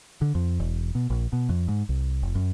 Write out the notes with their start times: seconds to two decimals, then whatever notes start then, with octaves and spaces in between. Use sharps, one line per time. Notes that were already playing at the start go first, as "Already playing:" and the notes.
0.22 D3
0.35 F2
0.60 E1
0.95 B2
1.10 A#1
1.33 B2
1.49 F2
1.68 G#2
1.89 C2
2.23 F1
2.35 F#2